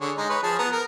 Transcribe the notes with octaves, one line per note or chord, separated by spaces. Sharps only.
D3 G#4 C#5
G#3 D#4
B4 C#5
F3 G#4 A5
B3 A#5
A#4